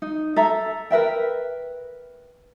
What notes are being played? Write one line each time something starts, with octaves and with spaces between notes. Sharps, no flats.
D#4
A4 E5 A#5
A#4 B4 E5 G5